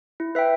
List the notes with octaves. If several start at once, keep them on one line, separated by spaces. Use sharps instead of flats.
E4
B4 E5 G5